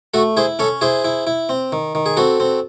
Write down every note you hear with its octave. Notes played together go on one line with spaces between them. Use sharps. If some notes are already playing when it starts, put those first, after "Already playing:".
A3 F#4 A4
E4 G#4 C5
C#4 A4 C#5
E4 G#4 C5
E4
E4
C4
D#3
D#3
G#4
C4 F#4 A4
C4